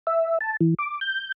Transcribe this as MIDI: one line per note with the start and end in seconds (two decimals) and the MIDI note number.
0.07 0.38 76
0.41 0.57 81
0.61 0.74 52
0.79 1.00 86
1.01 1.32 91